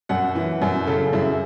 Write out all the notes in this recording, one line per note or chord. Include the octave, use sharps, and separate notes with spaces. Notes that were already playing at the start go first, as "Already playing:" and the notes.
F#2 F#5
E3
F#2
C#3 A4
F#2 E4